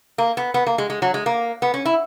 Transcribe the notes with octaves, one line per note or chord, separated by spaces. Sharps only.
A#3
B3
B3
A#3
G#3
G#3
F#3
G#3
A#3
B3
C#4
E4